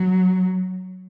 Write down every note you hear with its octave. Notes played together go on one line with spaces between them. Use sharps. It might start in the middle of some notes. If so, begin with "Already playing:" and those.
Already playing: F#3